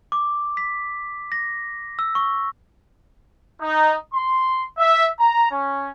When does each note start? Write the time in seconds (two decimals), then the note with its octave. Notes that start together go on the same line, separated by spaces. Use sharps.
0.12 D6
0.57 B6
1.32 A#6
1.99 E6
2.15 C#6
3.60 D#4
4.12 C6
4.78 E5
5.19 A#5
5.51 C#4